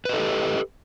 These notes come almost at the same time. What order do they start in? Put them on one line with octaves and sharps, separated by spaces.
B4 D#5 A4 G4